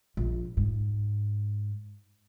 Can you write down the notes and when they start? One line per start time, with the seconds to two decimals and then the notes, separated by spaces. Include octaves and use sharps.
0.17 A#1
0.57 G#2